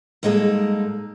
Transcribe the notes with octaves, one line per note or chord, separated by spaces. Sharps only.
G#2 G3 G#3 A#3 D#4 A4